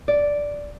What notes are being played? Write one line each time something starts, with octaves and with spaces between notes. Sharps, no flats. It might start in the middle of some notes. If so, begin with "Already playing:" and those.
D5